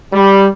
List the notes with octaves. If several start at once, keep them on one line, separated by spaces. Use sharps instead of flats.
G3